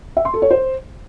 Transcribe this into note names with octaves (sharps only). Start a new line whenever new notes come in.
E5
C6
A4
C#5
C5